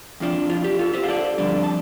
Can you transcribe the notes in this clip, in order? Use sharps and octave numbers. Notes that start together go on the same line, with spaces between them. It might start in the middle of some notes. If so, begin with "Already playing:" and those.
F2 F3 D4
F4
G4
F4 A4
G4 C5
F5
A4 D5
F2 D3 G3 D4
A5